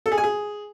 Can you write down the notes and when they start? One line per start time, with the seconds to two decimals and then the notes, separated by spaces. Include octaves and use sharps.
0.06 A4
0.12 G#4
0.18 G#5
0.24 G#4